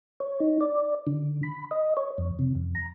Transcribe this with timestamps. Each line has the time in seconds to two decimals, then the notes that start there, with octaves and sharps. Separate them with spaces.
0.20 C#5
0.40 D#4
0.61 D5
1.07 D3
1.43 B5
1.71 D#5
1.97 C#5
2.18 F2
2.39 C3
2.55 F2
2.75 A#5